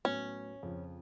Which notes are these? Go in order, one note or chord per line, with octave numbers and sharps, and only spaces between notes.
A2 F#3 B3 C#4
F2 C#3 F3